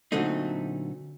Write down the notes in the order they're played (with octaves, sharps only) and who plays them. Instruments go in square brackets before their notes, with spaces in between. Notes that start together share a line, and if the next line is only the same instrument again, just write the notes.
[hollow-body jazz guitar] A#2 D3 F#3 A3 C4 D#4